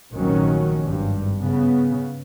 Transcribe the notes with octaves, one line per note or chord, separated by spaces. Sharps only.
F1 A#1 D#3 F#3 C#4
G#1 G2
C#3 B3